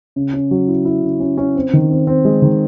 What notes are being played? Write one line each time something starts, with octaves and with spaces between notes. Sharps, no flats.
C#3
C#4
F#3
E4
E4
C#3
C#4
C#4
C4
D#3
C4
C4
G#3
D#3